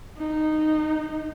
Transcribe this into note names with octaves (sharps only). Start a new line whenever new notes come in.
D#4